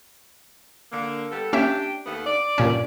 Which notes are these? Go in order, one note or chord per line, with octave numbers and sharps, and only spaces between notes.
D3 A#3
G3 B3 A4
A#3 C#4 D4 G4 E5
D#2 A3 B3
D5
G2 A#2 C#4